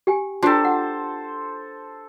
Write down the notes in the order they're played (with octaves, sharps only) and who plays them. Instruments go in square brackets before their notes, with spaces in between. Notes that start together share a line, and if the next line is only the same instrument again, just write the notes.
[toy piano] G4 G5 G#5
[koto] D4 G4 [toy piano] F4 A5 A#5 [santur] A4 C5
[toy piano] F#5